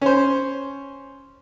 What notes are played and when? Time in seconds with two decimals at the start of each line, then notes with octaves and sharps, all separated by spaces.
0.02 C#4 C5